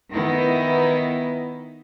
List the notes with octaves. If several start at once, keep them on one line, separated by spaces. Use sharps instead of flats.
D#3 B3 D#4 E4